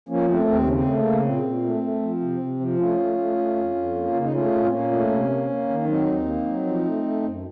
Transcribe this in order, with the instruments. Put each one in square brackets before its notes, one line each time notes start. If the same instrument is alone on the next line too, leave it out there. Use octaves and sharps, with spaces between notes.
[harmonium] F3 A#3 C#4
A3 C4
D#2 C4
C#3 C#4
C4
A3
A#3
C#3
A#2 C4
A#2
A3
A3
F3
C3
C3
F3
A3 C#4 F4
A3
A3
A3
F2
F2
A#3
C#3
D#4
A3 C#4 F4
A#2
C4
A#2 A#3 C#4
A3
C3
A#3
A#3
D#3
F#3 C4 D#4
D#2
A#3
F#3
F3
A3
A3
F#2